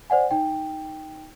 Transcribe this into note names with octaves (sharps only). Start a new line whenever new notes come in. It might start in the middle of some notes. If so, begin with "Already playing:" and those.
C5 D5 F#5 G#5
D#4 G5